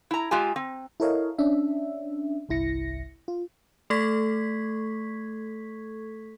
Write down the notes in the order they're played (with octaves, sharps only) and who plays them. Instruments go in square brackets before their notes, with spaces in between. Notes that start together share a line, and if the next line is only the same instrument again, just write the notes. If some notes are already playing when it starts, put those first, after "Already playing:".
[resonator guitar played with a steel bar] E4 A#5
G#3 F4 G4 G#5
C4
[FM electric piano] E4 A4 A#4 C#5 D#5 F5
C#4 D4 E5
G1 C2 E4 A#6 C#7
F4
[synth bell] A3 A4 C#6 G#6 B6